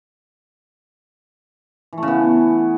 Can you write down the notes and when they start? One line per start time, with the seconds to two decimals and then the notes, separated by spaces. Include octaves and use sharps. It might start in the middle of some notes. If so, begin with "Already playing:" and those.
1.93 E3
1.98 A3
2.03 C#3
2.08 B3